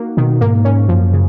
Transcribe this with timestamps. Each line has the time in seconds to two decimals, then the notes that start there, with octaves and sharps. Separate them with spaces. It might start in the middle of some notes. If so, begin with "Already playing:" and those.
Already playing: A#3 D#4 F#4
0.17 B2 D#3
0.41 G#2 A#3
0.65 C#4
0.89 F#2 F3
1.13 C#3